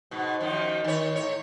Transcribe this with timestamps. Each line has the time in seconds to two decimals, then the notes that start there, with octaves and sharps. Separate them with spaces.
0.11 G#2 B2
0.41 F#2 D#3 F3
0.84 D#3 C#5
1.16 A2 C#5